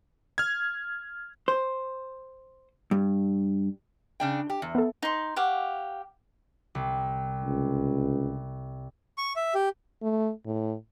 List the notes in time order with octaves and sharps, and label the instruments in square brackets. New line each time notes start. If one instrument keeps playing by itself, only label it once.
[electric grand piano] F6 G#6
[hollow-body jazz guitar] C5
G2
[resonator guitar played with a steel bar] C#3 D4 G5
G4
E2
[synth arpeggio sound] B3 A4
[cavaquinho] D#4 C6
G4 F5 F#5 C#6
[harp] C2
[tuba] C#2
[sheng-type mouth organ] C#6
E5
G4
[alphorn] A3
A2